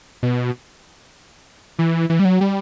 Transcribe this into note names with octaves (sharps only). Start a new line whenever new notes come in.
B2
E3
E3
G3
F#3
G3